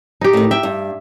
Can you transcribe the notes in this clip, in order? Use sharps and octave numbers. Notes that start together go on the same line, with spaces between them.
D#4 G4
A2 D#3
E5 G5
G2